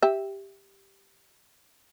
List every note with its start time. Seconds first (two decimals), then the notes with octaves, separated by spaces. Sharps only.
0.02 G4 E5